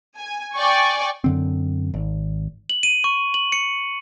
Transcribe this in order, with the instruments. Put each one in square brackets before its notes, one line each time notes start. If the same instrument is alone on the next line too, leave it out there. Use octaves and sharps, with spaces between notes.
[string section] G#5
D5 G5 G#5 C#6
[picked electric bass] F#2 D3 C4
G#1
[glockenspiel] F#7
D#7
C#6
F#7
C#7